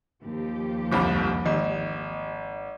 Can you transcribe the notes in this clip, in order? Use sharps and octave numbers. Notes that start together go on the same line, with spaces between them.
D#2 F3 G4
G1 C2 F2 B5 D6
G#1 D#5